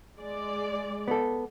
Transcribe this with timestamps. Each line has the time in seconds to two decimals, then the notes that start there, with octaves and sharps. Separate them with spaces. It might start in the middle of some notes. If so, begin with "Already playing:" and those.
0.18 G#3 D5
1.08 B3 A4